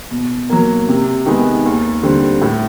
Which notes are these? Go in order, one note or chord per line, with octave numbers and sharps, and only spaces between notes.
B2
F#3 A#3
C3
D#3 G#3 B3
D#2
D3 G3 C4
A2